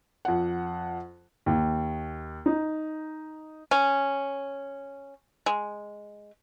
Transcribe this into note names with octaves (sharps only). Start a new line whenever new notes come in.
F2 F#5
D#2
D#4
C#4
G#3